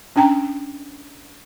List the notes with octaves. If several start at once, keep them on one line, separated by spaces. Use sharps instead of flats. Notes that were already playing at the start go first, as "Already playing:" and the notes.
C#4 D4 G5 A#5